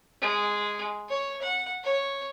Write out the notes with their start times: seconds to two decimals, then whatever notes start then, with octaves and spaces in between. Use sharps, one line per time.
0.21 G#3
1.09 C#5
1.42 F#5
1.83 C#5